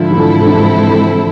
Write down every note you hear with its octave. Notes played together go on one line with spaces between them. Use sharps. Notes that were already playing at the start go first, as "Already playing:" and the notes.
Already playing: G#2 D3 F3 G#3 C4 E4 A4
E3
D3 F3
D3
C3 E3